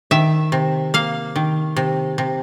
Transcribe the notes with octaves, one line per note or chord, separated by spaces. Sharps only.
D#3 E5
C3
A#3 F5
D#3
C3
C3